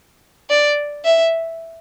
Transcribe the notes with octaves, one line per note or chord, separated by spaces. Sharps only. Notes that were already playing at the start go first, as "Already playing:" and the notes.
D5
E5